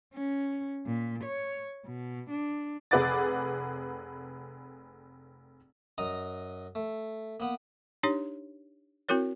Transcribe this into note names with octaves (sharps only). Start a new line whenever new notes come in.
C#4
A#2
C#5
B2
D4
F1 G#4 B4 F#5 D6 A6
F#2 D#5 A#5
A3
A#3 B3
D4 D#4 G4 C#5
C4 E4 F#4 A#4 C#5